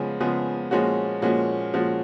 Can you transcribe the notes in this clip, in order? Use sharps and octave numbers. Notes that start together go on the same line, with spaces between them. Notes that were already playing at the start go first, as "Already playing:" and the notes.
Already playing: C#3 F3 G#3 B3
C#3 F3 G#3 B3
A#2 F3 G#3 C#4 F#4
A#2 F3 G#3 C#4 F#4
A#2 F3 G#3 C#4 F#4